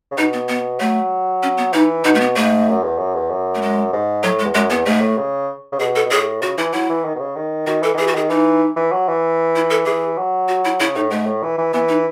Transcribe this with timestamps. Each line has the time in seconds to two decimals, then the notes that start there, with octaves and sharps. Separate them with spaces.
0.11 C#3
0.17 B2 D#4
0.33 B3
0.49 B3
0.79 F#3 A3
1.43 C#4
1.57 B3
1.73 E3 D#4
2.04 B2 D#4
2.15 A3
2.20 B3
2.36 G#2 A3
2.68 F#2
2.83 E2
2.98 F#2
3.15 E2
3.30 F#2
3.55 A3
3.62 G#3
3.93 G#2
4.23 A2 F#3
4.39 G#3
4.44 E2
4.54 F#2 G#3
4.70 E2 B3
4.86 G#2 A3
5.01 A2
5.17 C#3
5.72 C#3
5.79 B2 G#4
5.95 A4
6.05 B2
6.11 A2 G#4
6.42 C#3 F#4
6.58 E3 E4
6.73 F#3 E4
6.89 E3
7.05 D#3
7.15 B2
7.20 C#3
7.36 D#3
7.67 D#3 F#4
7.82 E3 A4
7.95 D#3
7.98 E3 G#4
8.07 F#4
8.14 D#3 G#4
8.30 E3 D#4
8.76 E3
8.92 F#3
9.08 E3
9.55 E4
9.70 A4
9.86 E3 G#4
10.18 F#3
10.48 F#4
10.65 E4
10.80 C#3 E4
10.95 A2 D#4
11.10 G#2 A3
11.26 A2
11.43 E3
11.58 E3
11.73 E3 B3
11.89 D#4